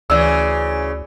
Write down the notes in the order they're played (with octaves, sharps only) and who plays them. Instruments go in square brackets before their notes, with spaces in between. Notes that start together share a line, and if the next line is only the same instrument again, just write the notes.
[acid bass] D2 [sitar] C#3 E3 [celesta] D5 E6